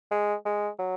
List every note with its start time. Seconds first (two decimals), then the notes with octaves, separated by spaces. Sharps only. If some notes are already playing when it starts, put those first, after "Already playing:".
0.11 G#3
0.45 G#3
0.79 F#3